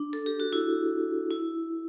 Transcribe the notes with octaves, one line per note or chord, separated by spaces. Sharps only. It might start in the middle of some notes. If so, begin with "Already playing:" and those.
Already playing: D4
A4
G4
F#4
E4
E4